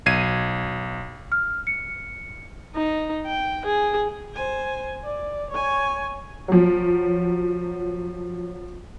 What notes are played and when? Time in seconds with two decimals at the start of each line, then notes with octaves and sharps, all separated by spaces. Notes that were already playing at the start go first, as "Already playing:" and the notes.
0.06 B1 G#6 C7 D#7
1.32 F6
1.67 C#7
2.75 D#4
3.26 G5
3.65 G#4
4.34 C5 G#5
5.04 D5
5.51 C#5 G#5
6.48 F3 F#3